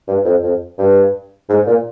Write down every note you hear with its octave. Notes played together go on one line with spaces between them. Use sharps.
G2
F2
F2
G2
G#2
A#2